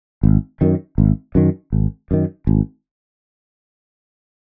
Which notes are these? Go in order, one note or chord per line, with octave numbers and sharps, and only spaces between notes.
G#1
F#2 D#3
G#1
F#2 D#3
G#1
F#2 D#3
G#1